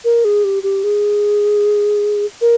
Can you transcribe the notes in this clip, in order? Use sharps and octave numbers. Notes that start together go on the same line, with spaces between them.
A#4
G#4
G4
G4
G#4
A#4